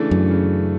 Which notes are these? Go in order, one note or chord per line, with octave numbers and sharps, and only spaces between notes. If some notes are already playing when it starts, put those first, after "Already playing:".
Already playing: C#3 E3 A3 D4 A4
F#2
C#3